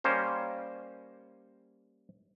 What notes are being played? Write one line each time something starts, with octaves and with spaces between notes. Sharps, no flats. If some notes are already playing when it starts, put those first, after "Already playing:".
G3 A#3 C#4 C5